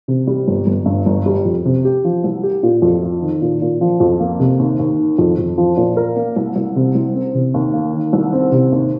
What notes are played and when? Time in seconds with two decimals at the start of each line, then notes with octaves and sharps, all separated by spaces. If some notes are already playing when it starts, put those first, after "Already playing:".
0.08 C3
0.27 G3
0.48 G1
0.67 G1
0.86 G2
1.06 G1
1.26 G3
1.45 F2
1.65 C3
1.85 G4
2.04 F3
2.24 C2
2.43 G4
2.63 A#2
2.82 F2
3.02 F4
3.22 D#3
3.42 A#2
3.62 A#2
3.81 F3
4.00 F2
4.20 A#3
4.40 C3
4.59 D#2
4.79 D#2
4.99 D#3
5.18 F2
5.38 F2
5.58 F3
5.77 A#2
5.97 A#4
6.16 A#3
6.36 C2
6.56 C2
6.76 C3
6.95 C2
7.14 C4
7.35 C3
7.54 D#2
7.74 A#3
7.93 D#3
8.13 C2
8.33 C4
8.52 C3
8.72 D#2